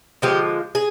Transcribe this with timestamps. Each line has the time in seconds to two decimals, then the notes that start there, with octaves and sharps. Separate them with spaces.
0.22 D3 F3 G#3 G4
0.75 G#4